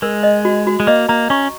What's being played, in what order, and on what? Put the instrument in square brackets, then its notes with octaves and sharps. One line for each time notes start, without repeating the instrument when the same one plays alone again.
[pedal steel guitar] G#3 [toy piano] A#4
[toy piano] D#5
F#4
F#4
[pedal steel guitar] G#3
[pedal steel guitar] A#3 [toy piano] D#5
[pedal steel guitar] A#3 [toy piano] A#5
[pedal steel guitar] C#4 [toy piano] C#6